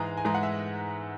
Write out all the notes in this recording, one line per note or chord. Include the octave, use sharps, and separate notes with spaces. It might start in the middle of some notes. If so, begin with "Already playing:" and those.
Already playing: G#2 E3 G#3 A#5
G#5
G#2 E3 G#3 A#5
F#5
E5